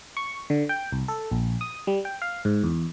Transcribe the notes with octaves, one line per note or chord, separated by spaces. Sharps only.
C#6
D3
G5
C2
A4
A#1
D#6
G3
G5
F5
G#2
E2